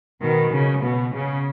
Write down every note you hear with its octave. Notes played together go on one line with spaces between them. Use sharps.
B2 D#3
C#3
B2
C#3